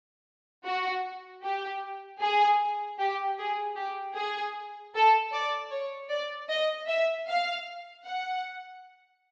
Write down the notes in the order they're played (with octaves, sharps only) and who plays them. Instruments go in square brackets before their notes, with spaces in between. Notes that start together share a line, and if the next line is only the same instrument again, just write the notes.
[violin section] F#4
G4
G#4
G4
G#4
G4
G#4
A4
D5
C#5
D5
D#5
E5
F5
F#5